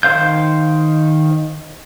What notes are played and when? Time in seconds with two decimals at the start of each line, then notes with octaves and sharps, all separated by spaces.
0.03 D#3 C5 F5 G6